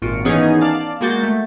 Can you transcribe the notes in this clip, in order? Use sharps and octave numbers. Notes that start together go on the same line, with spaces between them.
G#1 A#2 F4 F#4 C#7 D7
D#3 E3 B3 C#4 D#4 G#4
D5 F5 A5
G#3 A#3 F#4 G6 A6
A3